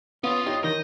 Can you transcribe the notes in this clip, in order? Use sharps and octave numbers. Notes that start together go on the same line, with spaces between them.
B3 C#4 F4 D#6
D#4 E4 G4 C#5
D#3 D#5 G6